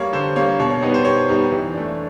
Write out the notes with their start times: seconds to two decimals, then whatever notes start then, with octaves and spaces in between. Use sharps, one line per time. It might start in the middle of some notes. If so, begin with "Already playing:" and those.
Already playing: G3 A#3 C#5
0.13 D3 C5
0.36 G3 A#3 C#5
0.60 B2 C#5
0.70 C#5
0.82 G3 B3 D#4 G4
0.94 C5
1.05 B2 C#5
1.28 G3 B3 D#4 G4
1.52 E3
1.74 A3 D4